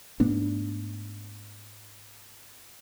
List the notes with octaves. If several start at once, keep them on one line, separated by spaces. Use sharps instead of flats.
G#2 A3 B3 D4